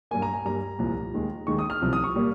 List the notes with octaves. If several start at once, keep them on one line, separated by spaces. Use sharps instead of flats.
G2 G3 A#3 G#5
A#5
G#5
G2 G3 A#3 A#5
C2 A#2 F3
D#2 D#3 G#3
D#2 D#3 G#3 C#6
D#6
F6
C2 C3 F3
D#6
C#6
A#2 G3 A#3